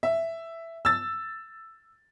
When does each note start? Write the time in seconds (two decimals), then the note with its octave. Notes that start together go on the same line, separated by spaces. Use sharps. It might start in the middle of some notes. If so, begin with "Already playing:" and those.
0.03 E5
0.85 E6 A6